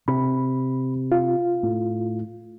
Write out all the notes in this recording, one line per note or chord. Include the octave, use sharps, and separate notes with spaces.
C3 B5
F4
A2